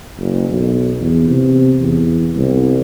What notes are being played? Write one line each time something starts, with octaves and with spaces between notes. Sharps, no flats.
F#1
B1
E2
C3
E2
C2